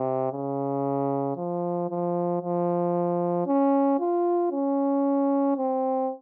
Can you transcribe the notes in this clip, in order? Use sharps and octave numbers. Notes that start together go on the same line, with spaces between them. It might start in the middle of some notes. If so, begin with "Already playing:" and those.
Already playing: C3
C#3
F3
F3
F3
C#4
F4
C#4
C4